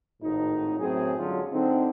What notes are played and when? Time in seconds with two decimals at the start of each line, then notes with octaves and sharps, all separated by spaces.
0.22 G#1 A2 D#4
0.80 F#2 A2 F#3 C4 G#4
1.18 G2 D3 F#3 G#3 C#4 F4
1.51 D3 C4 D#4